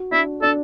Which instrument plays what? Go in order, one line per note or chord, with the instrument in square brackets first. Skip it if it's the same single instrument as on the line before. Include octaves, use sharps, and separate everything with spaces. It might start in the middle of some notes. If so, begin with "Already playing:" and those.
Already playing: [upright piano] F#4
[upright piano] D4 [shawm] E4
[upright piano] D4 [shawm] A4